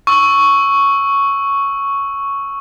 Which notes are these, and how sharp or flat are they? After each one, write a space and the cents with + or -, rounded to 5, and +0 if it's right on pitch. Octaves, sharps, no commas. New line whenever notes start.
C#6 +0 E6 +0